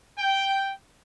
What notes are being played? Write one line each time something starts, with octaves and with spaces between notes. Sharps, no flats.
G5